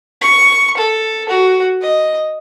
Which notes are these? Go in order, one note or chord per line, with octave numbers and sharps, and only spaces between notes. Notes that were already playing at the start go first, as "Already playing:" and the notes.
C#6
A4
F#4
D#5